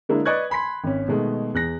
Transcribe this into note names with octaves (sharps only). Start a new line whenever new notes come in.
D3 G#3 A#3 D4 E4
B4 D5 D#5 C#6 F#6 G#6
G#5 B5 C6 B6
G#1 C#4
B2 D#3 G#3 A3
E2 F#6 A#6